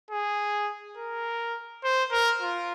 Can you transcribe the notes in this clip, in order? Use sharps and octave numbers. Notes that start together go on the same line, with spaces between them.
G#4
A#4
C5
A#4
F4